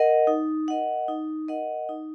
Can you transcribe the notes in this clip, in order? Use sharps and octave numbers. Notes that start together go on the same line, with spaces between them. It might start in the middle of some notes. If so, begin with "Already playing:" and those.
Already playing: A#4 D#5 F#5
D#4
A#4 D#5 F#5
D#4
A#4 D#5 F#5
D#4